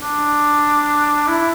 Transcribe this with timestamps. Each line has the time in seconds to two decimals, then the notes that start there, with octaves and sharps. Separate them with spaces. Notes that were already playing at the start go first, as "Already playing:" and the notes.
0.01 D4
1.27 E4